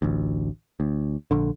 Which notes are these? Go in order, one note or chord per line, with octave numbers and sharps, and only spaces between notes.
A1 D2
D2
A#1 D3